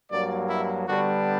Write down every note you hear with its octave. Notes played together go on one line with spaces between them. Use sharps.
G2 F#3 A#3 D5
E4
D3 G3 B3 D4 F#4